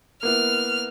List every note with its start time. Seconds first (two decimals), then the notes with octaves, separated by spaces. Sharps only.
0.23 A#3 B3 E4 F6